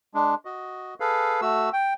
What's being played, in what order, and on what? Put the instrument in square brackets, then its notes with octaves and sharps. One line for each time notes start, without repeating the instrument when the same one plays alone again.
[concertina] G#3 D4
F#4 D#5
G#4 A4 B4 F5
A3 F#4 E6
G5